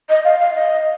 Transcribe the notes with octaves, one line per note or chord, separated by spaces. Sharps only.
D#5
F5
F5
D#5